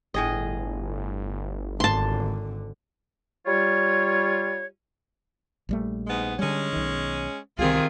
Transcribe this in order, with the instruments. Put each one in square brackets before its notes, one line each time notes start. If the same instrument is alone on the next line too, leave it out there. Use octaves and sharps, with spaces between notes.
[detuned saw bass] G1 [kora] A2 G#4 D#5
[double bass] G#1 D3 [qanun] A5 C6
[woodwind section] G3 F4 C#5
[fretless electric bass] A#1 G3 A3
[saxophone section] G#2 G#3 B3
[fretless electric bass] D3 G3 [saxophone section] G#3 C#4
[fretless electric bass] B1 D#3
[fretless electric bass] C2 [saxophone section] C3 G#4 [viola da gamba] D#3 C4 F4